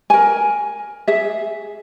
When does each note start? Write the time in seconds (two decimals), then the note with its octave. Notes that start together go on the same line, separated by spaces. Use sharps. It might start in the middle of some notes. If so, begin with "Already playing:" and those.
0.10 A#4 G#5
1.08 G#4 E5